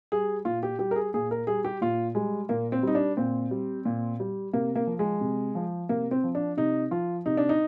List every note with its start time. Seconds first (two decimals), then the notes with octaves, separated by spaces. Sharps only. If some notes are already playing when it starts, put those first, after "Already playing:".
0.12 G3 G#4
0.45 A#2 F4
0.63 G4
0.79 G3 G4
0.91 A#4
0.96 G#4
1.14 A#2 G#4
1.31 A#4
1.47 G3 G#4
1.65 G4
1.81 A#2 F4
2.15 G3 G#3
2.49 A#2 A#3
2.72 C4
2.83 G3 D#4
2.95 D4
3.17 A#2 C4
3.51 G3
3.85 A#2
4.20 G3
4.53 C3 A#3
4.75 A#3
4.87 F3
4.99 G#3
5.21 C3
5.55 F3
5.89 C3 A#3
6.11 C4
6.24 F3
6.35 D4
6.57 C3 D#4
6.91 F3 F4
7.26 C3 D#4
7.37 D4
7.49 D#4